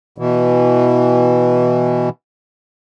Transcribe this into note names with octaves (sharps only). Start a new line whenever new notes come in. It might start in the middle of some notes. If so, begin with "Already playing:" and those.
B2 E3